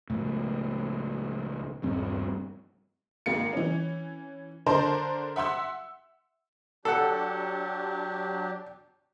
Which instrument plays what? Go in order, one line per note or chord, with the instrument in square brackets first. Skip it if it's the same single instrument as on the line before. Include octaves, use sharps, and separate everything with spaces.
[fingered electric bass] C#2 A2
D#1 G2 C4
[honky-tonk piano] G#1 A#3 C#7
E3 C#4
D3 D4 A#4 C5 A5 C6
E5 F#5 C6 E6
[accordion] F#3 D4 G4 [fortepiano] A4 F#5